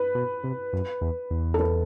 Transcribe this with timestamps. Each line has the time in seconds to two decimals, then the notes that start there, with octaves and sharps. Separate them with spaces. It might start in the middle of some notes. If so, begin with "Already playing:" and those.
Already playing: B4
0.15 B2
0.44 C3
0.73 F#2
1.01 E2
1.31 E2
1.54 A4
1.60 B4